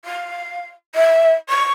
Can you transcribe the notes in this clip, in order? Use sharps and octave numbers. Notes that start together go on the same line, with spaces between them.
F5
E5
C#6